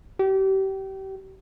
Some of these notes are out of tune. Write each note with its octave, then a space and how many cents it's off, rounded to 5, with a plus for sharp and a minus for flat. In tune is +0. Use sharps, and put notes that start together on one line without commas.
G4 -30